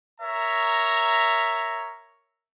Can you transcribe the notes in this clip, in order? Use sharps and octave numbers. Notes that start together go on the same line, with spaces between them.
A#4 C#5 E5 A#5